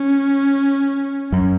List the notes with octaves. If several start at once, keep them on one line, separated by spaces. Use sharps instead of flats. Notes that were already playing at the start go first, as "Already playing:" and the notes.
Already playing: C#4
F#2